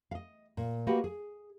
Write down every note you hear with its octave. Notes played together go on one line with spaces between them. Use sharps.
D#5 F5
A#2
A#3 F#4 G4 B4 D#5 F#5
G#4